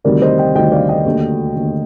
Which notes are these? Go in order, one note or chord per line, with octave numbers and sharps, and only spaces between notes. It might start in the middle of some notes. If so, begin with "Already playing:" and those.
D2 C3 D#3 G3 A#4 D5
C5 D#5
D#5 G5
D2 C3 D#3 G3 D#5 G5
D5 F5
D#5 G5
D#2 D3 A3
D#2 D3 A3